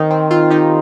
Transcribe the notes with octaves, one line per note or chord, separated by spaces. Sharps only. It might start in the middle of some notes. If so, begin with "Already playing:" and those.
Already playing: D#3 C4 D#4
C4
C4 F4
D#4 G4